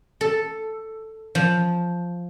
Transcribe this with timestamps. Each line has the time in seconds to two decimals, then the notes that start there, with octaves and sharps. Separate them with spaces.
0.21 A4
1.35 F3